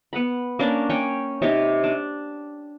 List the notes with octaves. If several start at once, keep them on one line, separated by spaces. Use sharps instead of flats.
B3 F#5 B5
A#3 C#4 D4
C#4 C#5 G5
C3 D#4 G4 C#5
D4